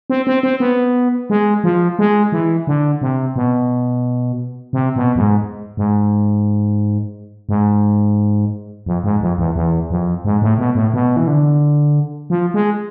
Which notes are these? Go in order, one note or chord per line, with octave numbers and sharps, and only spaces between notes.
C4
C4
C4
B3
G#3
F3
G#3
E3
D3
C3
B2
C3
B2
F2
G#2
G#2
G#2
F2
G#2
F2
E2
E2
F2
G#2
A2
B2
A2
B2
E3
D3
F3
G#3